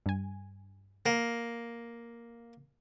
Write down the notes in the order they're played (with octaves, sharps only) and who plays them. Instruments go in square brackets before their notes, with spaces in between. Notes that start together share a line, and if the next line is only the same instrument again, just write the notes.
[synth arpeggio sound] G2 G#5
[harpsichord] A#3